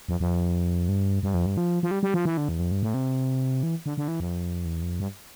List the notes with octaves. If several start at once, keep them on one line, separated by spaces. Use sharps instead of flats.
F2
F2
G2
G2
F2
G2
F3
F3
G3
G3
F3
E3
D3
E2
F2
G2
A2
C3
E3
D3
D3
E3
F2
E2
F2
G2